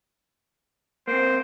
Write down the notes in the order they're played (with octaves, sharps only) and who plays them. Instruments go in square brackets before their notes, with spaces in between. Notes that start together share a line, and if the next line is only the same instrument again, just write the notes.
[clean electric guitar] A#3 C4 [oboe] C5